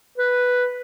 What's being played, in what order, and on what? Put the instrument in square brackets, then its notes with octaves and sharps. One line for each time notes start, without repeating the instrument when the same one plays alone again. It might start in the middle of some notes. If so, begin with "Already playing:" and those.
[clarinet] B4